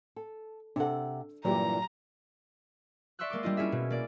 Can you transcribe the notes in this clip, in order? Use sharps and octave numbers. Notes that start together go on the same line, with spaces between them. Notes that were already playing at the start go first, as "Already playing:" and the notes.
A4
C3 D4 A4 F#5
G2 A#2 E3 F#3 G4 A#5
D5 E5 C6 C#6 E6 F#6
G#3 A#3 C6 D6
G3 D4 F4 D#5
C#4 E4 G#4 E5
B2
A#3 D5